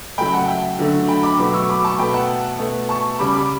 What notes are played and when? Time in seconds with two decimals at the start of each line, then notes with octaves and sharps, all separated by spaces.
0.18 C#3 F#3 A3 G5 B5
0.33 F#5 A5
0.48 E5 G5
0.79 D3 F#3 A3
1.08 G5 B5
1.23 B5 D6
1.38 B2 F#3 A3 B5 D6
1.54 C#6 E6
1.69 B5 D6
1.84 A5 C#6
1.99 B2 A3 G5 B5
2.14 F#5 A5
2.59 B2 A3
2.89 A5 C#6
3.19 C#3 G3 B5 D6
3.34 B5 D6